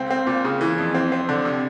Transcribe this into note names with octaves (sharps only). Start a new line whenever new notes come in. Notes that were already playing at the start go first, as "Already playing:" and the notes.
Already playing: C#2 C4
C4
A#2
C#3
E3
F2
C4
C4
D3
C3